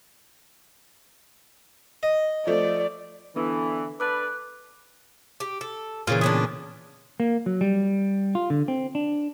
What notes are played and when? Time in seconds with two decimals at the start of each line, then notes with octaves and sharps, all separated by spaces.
2.03 D#5
2.47 F3 A3 D5
3.36 D3 E3 B3 D4 A4
4.00 D4 A4 B4 D6 F#6
5.40 G4
5.61 A4
6.07 A#2 C#3 E3 F4
6.21 B3 C#4 D4
7.20 A#3
7.46 F#3
7.61 G3
8.35 F4
8.50 D3
8.68 C4
8.95 D4